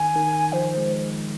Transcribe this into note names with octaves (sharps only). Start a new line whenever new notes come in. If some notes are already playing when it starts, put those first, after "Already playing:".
Already playing: D#3 G#5
D#3
F3 C5
G#3